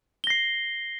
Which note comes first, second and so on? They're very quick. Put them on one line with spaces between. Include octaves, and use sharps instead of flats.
G7 A#6 C7